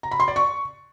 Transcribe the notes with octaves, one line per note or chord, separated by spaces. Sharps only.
A#5
B5
C6
D5
C#6